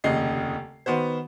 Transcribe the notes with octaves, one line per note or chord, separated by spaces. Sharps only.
F1 D#2 C#3 D#5 C7
D#3 B3 F#4 C5